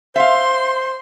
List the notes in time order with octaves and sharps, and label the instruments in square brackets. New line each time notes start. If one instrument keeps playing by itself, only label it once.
[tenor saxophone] C5 [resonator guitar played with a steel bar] E5 F5 [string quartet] C6